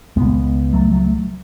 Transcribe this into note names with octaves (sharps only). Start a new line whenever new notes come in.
C#2 B2 G#3 B3
F#3 A3
F#3 A3